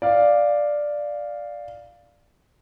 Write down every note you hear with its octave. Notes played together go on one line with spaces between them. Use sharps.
D5 F5